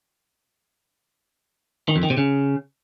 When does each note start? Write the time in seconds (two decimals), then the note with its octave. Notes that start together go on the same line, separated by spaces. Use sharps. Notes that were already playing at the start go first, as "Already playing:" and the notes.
1.89 D#3
1.96 F2
2.03 D#3
2.10 C3
2.17 C#3